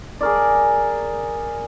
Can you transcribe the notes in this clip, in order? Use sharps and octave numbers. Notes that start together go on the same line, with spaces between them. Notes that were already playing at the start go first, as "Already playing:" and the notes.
G#4 A#4 D5